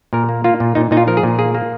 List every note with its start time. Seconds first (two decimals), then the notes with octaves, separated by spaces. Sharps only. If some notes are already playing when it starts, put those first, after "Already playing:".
0.13 A#2 A#4
0.29 A#3
0.44 A#3 F4
0.60 A#2
0.75 A#2 D#4
0.91 A#2 D#4
0.97 F4
1.07 F3 A#4
1.17 G#4
1.23 A#2
1.39 A#3 G#4
1.55 A#3